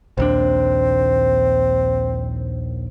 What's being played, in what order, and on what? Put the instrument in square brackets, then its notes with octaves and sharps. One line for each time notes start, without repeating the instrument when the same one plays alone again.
[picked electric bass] A#1 D#2 D4 [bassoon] C4